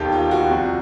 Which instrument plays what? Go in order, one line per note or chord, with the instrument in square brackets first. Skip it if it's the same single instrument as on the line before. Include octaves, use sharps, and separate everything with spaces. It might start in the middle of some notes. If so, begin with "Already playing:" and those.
Already playing: [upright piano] E1 D#2 D#3 G4 A4
F4
F#4
C2 C3 F3